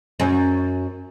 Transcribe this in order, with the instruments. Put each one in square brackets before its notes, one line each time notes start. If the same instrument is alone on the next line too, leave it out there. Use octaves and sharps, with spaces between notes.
[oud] F#2 C#4